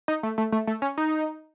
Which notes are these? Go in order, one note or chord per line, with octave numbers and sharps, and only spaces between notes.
D#4
A3
A3
A3
A3
C#4
D#4